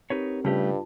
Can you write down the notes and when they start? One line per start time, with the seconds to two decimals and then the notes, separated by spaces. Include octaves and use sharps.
0.10 C4 D#4 G4 A#4 B4 C#5
0.45 G2 C#3 G3 A3 F4 G4 A5